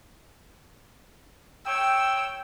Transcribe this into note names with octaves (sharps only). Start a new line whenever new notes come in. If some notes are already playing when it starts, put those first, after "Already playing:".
C#5 G5 E6